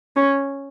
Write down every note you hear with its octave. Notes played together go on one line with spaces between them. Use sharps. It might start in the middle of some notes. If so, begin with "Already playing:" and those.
C#4